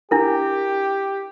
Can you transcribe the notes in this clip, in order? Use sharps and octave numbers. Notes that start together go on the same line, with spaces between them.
D4 E4 G4 A#4